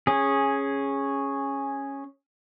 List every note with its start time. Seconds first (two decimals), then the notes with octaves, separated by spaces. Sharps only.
0.07 C#4 G#4